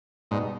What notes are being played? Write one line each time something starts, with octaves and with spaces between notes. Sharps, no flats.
G#2 B2 G3 B3 D#4